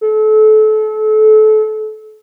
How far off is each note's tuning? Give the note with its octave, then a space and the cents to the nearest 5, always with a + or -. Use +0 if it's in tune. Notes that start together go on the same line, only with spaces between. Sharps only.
A4 -30